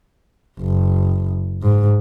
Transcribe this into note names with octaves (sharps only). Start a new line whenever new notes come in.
F#1
G#2